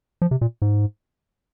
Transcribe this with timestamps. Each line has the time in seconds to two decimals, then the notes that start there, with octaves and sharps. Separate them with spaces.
0.22 F3
0.31 C3
0.41 A#2
0.62 G#2